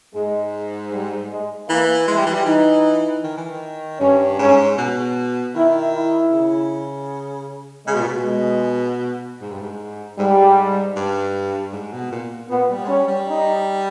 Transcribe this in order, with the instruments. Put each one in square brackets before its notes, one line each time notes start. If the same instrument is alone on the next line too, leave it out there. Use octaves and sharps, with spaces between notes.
[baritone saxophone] G#2 [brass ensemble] G#3
[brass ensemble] G3
G#3
[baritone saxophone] E3 [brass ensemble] A#3
[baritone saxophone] G#3 [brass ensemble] E4
[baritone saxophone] G3
E3
G3
[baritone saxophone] E3 [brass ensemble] D#4
[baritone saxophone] D#3
E3
D#3
[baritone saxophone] G2 [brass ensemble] C#4
[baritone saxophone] G#2 [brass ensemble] C#4
[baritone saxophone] B2
[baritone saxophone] D#3 [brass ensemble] E4
[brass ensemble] E4
[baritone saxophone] C#3
[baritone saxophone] C#3 [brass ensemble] G#3
[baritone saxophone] B2
A#2
B2
[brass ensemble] G#3
[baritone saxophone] G#2
G2
G#2
[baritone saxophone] G#2 [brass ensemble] G3
[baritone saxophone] G2
G#2
B2
A#2
[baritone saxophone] A#2 [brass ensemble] B3
[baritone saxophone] G3
G#3
[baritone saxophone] G3 [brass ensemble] C#4
[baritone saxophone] G3
[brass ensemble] D#4